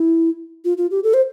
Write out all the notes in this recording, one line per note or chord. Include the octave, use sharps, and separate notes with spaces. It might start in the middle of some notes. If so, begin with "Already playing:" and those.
Already playing: E4
F4
F4
G4
A4
C5